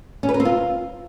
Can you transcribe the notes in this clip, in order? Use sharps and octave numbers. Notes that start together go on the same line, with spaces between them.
C#4
B4
A#4
C4
F4